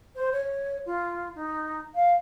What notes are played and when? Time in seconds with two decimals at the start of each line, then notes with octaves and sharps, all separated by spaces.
0.16 C5
0.32 C#5
0.86 F4
1.35 D#4
1.95 F5